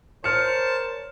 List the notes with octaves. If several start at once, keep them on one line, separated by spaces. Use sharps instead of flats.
A#4 C5 C#5 A5 F6 C#7